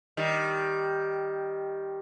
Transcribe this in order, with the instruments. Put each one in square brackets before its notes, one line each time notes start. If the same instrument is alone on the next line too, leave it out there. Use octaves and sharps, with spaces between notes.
[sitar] D#3 G3